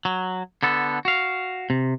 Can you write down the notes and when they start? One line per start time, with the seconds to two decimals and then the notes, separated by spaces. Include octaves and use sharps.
0.05 F#3
0.63 D3 B3 A4
1.05 F#4 F5
1.70 C3